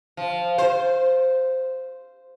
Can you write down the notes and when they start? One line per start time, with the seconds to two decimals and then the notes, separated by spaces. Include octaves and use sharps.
0.17 F3
0.58 C5